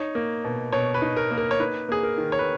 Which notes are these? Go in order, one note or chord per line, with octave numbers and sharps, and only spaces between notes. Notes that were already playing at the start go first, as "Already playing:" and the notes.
Already playing: D#4 C#5
A#3
B2
B2 C#5
B4
D#4
A#4
A#3
A#4
C#5
D#4 B4
A#3 G#4
A#4
D#3
C#5
B4